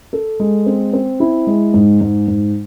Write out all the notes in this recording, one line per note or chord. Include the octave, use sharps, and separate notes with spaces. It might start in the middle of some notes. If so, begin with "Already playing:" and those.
A4
G#3
C4
C4
E4
G#3
G#2
G#2
G#2